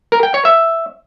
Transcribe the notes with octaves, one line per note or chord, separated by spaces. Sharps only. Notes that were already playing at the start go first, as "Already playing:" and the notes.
A#4
G5
C#5
E5